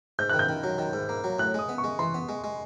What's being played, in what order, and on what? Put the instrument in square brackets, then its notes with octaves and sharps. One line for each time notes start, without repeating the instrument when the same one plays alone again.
[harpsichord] G#2 [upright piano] G6
[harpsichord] D#3 [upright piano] F#6
[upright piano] G6
[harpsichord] D#3
F#3
D#3
G#2
A#3
F#3
[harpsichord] A2 [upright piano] F#6
[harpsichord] G#3 [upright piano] D#6
[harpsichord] B3
[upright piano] C#6
[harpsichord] G#3
[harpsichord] E3 [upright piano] C6
[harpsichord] B3
G#3
G#3